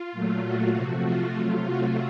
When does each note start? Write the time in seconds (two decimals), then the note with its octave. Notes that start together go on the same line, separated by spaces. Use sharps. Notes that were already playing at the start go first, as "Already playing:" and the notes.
Already playing: F4
0.12 A#2 F#3 A3
0.44 F#4
0.75 C3 F3 A3
1.05 F4
1.36 C3 F#3 A3
1.68 F#4